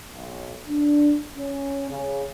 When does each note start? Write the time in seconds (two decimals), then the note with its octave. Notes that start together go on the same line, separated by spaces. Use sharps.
0.12 B1
0.68 D4
1.37 C#4
1.90 C#3